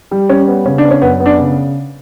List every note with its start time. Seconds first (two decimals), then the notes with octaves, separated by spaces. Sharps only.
0.11 G3
0.29 G3 C#4
0.47 B3
0.65 C#3 C#4
0.78 D4
0.85 B3
0.91 C#4
1.02 F#2 B3
1.20 B3
1.26 D4
1.38 C#3